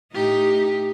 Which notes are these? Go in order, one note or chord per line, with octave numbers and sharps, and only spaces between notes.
A2 D#4 G4